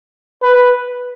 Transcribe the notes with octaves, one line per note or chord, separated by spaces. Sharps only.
B4